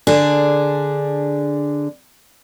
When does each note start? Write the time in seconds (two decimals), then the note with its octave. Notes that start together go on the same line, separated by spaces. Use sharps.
0.07 D3 D4 G#4